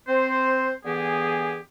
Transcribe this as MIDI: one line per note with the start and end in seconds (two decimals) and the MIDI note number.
0.08 0.73 60
0.08 0.73 72
0.85 1.59 50
0.85 1.59 52
0.85 1.59 59
0.85 1.59 67
0.85 1.59 68